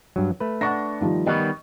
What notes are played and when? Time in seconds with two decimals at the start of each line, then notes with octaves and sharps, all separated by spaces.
0.16 G2 F#3
0.40 A3 B4
0.61 D4 F#5 C#6 A#6
1.01 D#3 F3 G3
1.26 D#3 G3 B3 D#5 C#6